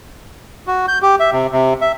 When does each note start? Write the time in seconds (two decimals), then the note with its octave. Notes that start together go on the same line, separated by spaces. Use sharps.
0.67 F#4
0.88 G6
1.02 G4
1.20 E5
1.33 C3
1.52 C3
1.81 E5